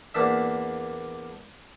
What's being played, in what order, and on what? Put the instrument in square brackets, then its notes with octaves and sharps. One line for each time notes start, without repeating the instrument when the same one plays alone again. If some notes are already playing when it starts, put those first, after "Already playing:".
[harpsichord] E2 A#3 D4 E5